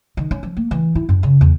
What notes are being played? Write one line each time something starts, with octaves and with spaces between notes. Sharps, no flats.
D#3
C#4
F3
A#3
E3
E4
F#2
C#3
E2